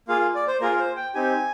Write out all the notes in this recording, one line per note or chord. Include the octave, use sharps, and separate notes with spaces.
A#3 F4 G#4 F5
D5
C5
A#3 F4 G#4 A#4
C5
G5
C4 D#4 G4 G#5